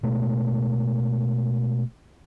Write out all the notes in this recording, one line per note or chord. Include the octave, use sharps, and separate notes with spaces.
B2 G#3 A3